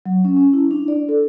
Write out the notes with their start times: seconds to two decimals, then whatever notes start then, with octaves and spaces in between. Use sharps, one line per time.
0.06 F#3
0.24 C#4
0.37 C#4
0.53 E4
0.71 D4
0.88 D5
1.09 A4